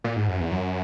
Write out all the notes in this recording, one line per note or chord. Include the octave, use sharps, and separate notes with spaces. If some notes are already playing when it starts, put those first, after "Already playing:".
A#2
G#2
F#2
E2
F#2